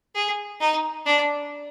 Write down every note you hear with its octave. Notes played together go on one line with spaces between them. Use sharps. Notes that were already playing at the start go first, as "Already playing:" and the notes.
G#4
D#4
D4